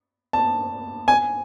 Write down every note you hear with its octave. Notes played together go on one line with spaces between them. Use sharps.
A5
G#5